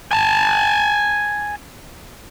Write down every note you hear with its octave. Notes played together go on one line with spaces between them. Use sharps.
G#5 A5